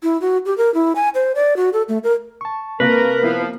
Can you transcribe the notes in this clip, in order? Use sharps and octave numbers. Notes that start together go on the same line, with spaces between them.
E4
F#4
G4
A#4
E4
G#5
C5
D5
F#4
A4
A3
A#4
A5 C#6
C3 A#3 A#4 B4
F3 B3 E4 F4 F5